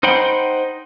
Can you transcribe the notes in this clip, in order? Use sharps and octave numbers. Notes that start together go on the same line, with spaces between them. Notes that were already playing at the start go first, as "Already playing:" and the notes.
D#4 C5 F#5 G5 B5